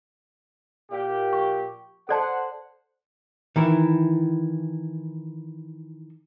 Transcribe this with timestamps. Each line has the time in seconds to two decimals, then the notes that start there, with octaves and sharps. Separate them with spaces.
0.91 A#2 G4
1.33 C#6
2.09 A4 C5 D5 F#5 A5
3.56 D#3 E3 E4